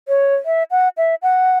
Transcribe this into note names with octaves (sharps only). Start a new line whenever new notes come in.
C#5
E5
F#5
E5
F#5